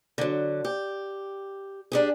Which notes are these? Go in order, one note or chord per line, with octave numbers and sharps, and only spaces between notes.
D3 F#3
G4
D4 G4 G#4